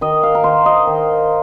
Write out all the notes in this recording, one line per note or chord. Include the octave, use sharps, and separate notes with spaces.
D#3 D#5
F5
A#4
D#3 C5
D#5
D#3